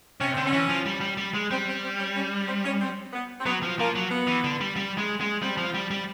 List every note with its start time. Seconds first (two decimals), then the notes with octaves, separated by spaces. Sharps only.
0.20 C3 C#4
0.33 D3 C4
0.46 C#4
0.53 E3
0.69 F3
0.86 G3
1.01 G3
1.17 G3
1.34 G#3
1.51 G3 C4
1.67 C4
1.84 C4
1.99 C#4
2.15 C#4
2.48 C4
2.64 C#4
2.81 C4
3.13 B3
3.41 C4
3.46 F#3 B3
3.63 F3
3.79 F3 A#3
3.95 F#3
4.11 B3
4.27 E3
4.44 D3
4.61 G3
4.76 G3
4.98 G#3
5.21 G#3
5.42 G3 C4
5.58 F3
5.74 G3
5.91 G3